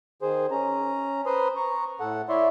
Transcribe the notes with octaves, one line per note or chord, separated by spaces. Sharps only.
D#3 G#4 C5
C#4 A#5
B4 C5 A#5 C6 D#6
A#5 C#6
A2 A4 F#5
E4 C#5 D5 E5 C6